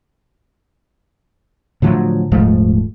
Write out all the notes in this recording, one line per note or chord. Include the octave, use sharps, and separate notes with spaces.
A2 D3 F3 F#3
D#1 G#2 F3 A3